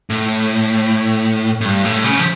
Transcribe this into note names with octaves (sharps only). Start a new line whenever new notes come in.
A2
A2
G2
A2
C#3
F3